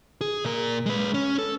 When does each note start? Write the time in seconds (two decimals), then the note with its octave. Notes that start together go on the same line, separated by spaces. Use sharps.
0.21 G#4
0.45 A#2 A#4
0.86 G#3 B4
1.14 C#4
1.39 A4